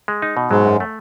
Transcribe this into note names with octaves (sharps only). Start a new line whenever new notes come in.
G#3
D#4
B2
G#2 F#3 G#3
F#2
A3